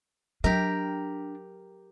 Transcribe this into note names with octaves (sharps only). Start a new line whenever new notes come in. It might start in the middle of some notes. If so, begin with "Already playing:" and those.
F#3 D4 G4 A#4